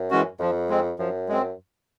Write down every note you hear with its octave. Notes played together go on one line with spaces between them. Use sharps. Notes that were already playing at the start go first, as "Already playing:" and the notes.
Already playing: F#2
E3 G#3 C#4 F#4
F2 F3
G#3 C4
F#2 F3
G#3 C4